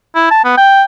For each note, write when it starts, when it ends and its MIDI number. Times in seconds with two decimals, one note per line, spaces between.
0.15 0.29 64
0.31 0.45 81
0.45 0.57 59
0.57 0.83 79